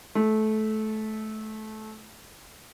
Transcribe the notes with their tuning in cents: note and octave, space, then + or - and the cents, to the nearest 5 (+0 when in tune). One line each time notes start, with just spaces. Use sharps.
A3 -20